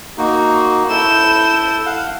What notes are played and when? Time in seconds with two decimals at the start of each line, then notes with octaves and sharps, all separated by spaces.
0.18 A#3 D#4 F#4
0.90 E4 A4 G6 E7
1.86 F5 F#5